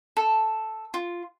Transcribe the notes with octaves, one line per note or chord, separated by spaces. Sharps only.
A4
F4